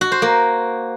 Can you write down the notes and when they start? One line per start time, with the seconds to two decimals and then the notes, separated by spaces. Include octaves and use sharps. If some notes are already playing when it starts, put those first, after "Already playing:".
0.01 F#4
0.12 C5
0.22 A#3